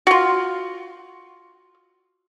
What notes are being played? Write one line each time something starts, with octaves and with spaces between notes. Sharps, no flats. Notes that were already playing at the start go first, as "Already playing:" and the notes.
F4 F#4